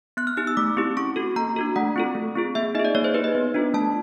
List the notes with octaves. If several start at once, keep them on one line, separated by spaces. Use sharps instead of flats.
B3 F#6
F6
D#4 G4 F6
E6
A3 D6
C4 E4 G4
C#4 C#6
F#4 A4
A#3 A#5
D4 F#4 A4
A3 F#5
C4 F4 A4
A3
C4 F4 G#4
A#3 E5
D#4 G#4 D#5
D5
A#3 C#5
C5
D#4 G4 B4
D#5
B3
D4 F4 A4
A3 A5